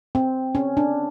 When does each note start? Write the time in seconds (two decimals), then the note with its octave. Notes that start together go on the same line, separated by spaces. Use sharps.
0.15 C4
0.55 C#4
0.77 D4